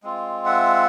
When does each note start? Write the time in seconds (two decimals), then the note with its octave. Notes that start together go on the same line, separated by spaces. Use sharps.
0.03 G#3 C4 F4
0.46 E5 F#5